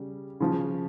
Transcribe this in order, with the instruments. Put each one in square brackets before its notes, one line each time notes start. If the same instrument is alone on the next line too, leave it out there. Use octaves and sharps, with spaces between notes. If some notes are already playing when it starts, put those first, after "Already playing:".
Already playing: [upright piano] C#3 G3
C#3 F3